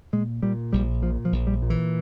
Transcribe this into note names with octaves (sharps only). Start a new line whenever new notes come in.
A#2 G#3
A#2 G3
A#1 G3
A#2 F3
F3
A#1
G3
A#2
E3